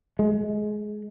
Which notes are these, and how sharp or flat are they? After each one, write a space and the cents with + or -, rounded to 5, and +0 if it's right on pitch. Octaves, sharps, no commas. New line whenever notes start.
G#3 +20